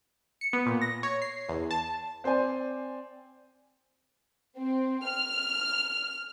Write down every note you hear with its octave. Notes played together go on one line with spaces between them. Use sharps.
C#7
B3
A#2
A#6
C#5
C7
E2
A5
C4 C5 D5 G#5
C4
F6